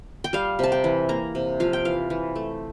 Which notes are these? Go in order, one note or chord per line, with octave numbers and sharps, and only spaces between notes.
G5
G3 F5
C3 A5
G5
E3
A#3 A#5
C3
F3 F5
G5
E3 F5
E3
A3